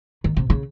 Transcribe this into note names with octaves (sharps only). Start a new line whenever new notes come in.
D#3
C3
C#3